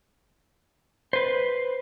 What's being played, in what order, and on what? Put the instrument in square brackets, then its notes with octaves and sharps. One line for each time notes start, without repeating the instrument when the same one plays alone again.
[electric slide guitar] B4 C5